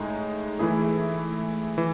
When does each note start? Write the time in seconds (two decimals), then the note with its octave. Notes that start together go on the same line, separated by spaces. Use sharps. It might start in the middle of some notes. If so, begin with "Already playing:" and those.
Already playing: A2 G#3 D#4 G#4
0.59 E3 A3 E4 G#4
1.78 E3